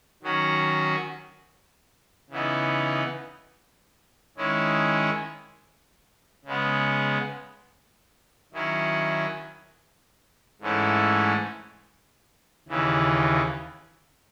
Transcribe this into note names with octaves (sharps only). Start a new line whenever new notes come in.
D#3 F#3 C#4 F#4
C#3 E3 B3 D#4
D#3 G#3 C#4 E4
C#3 G#3 B3
D#3 F#3 C#4 E4
G#2 E3 A3 C#4 E4
D#2 C#3 E3